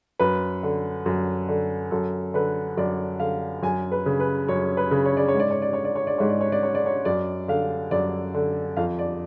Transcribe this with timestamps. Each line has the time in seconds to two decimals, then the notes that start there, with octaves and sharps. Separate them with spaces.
0.19 F#2 B4
0.63 D3
1.06 F#2
1.49 D3
1.91 F#2 A4
2.34 D3 B4
2.77 F#2 D5
3.20 D3 F5
3.62 F#2 G#5
3.92 B4
4.06 C#3
4.20 B4
4.48 F#2 C#5
4.77 B4
4.91 C#3
5.05 C#5
5.17 D5
5.28 C#5
5.34 G#2
5.40 D5
5.51 C#5
5.62 D5
5.73 C#5
5.85 D5
5.95 C#5
6.07 D5
6.18 G#2 C#5
6.29 D5
6.41 C#5
6.52 D5
6.63 C#5
6.75 D5
6.86 C#5
7.05 F#2 D5
7.48 D3 F5
7.91 F#2 D5
8.34 D3
8.77 F2 F5
8.99 D5